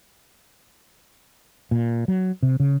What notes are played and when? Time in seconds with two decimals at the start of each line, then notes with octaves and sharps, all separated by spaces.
1.71 A#2
2.08 F#3
2.43 C3
2.60 C#3